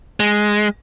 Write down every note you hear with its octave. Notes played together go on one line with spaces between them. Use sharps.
G#3